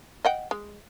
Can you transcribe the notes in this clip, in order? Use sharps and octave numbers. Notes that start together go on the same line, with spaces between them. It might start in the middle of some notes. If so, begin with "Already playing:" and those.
D#5 F#5 G5
G#3